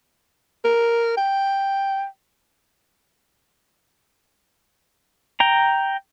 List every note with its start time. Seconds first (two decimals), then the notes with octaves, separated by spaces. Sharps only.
0.65 A#4
1.17 G5
5.40 G5 A#5